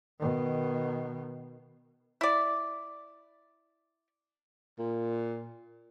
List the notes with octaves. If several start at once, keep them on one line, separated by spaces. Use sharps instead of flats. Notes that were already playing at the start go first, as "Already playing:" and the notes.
B2 D#3
E4 D5
A#2